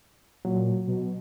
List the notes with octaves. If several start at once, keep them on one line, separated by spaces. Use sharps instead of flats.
A#2 F#3
B2